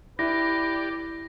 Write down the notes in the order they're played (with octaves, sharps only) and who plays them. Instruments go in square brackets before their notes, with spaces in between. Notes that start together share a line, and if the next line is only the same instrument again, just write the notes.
[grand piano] E4 [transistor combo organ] G4 D5 [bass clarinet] B4 [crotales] A#6